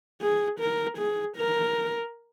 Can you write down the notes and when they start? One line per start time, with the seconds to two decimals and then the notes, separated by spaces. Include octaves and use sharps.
0.21 G#4
0.60 A#4
0.98 G#4
1.37 A#4